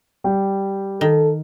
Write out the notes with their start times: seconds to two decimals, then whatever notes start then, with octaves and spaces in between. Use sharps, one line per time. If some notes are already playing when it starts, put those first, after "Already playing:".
0.24 G3 G4
1.01 D#3 A4